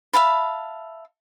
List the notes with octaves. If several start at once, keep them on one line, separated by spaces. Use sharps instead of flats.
E5 F5 A5 B5